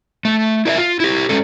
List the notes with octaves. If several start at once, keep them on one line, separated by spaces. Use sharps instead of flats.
A3
E4 A#4 D#5 E5
F4
E4 G4
G#3 C#4 A4